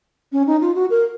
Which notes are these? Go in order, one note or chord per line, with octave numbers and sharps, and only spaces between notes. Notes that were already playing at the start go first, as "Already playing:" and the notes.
C#4
D#4
F4
F#4
A#4